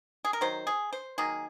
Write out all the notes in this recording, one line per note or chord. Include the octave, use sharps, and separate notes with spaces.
G#4
A#4
D#3 F#3 C5
G#4
C5
D#3 F#3 A#3 G#4